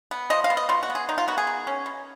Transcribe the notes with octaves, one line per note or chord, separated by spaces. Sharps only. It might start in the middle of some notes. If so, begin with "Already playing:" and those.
B3
F3 D#5
F5
B3
D#5
B2 F4
F#4
B3
G#4
D#3 D#4
F4
B3 F#4
G#4
D#3
C#4
B2